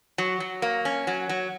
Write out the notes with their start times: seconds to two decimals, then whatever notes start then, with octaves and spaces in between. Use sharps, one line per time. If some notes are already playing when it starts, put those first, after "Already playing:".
0.18 F#3
0.40 F#3
0.62 A#3
0.85 C#4
1.07 F#3
1.29 F#3